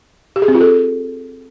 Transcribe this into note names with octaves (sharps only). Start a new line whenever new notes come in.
G4
G#4
C4
F4
A4